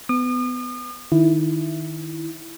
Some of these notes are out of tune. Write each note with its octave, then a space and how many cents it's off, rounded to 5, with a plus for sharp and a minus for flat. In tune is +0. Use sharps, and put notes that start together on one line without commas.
B3 +25 D#6 -40
D#3 -5 E4 +0